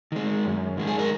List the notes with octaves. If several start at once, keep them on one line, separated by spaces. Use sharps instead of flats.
D#3 G#3
F#2
D#3 G#3
G#4
A#4